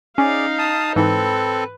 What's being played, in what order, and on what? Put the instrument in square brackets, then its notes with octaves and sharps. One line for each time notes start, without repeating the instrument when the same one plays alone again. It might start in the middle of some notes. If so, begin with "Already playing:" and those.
[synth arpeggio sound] C#4 [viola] D#4 F5 [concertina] G#4 D5
[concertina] A5 D#6
[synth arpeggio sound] G#2 E3 [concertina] C4 A4 [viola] B4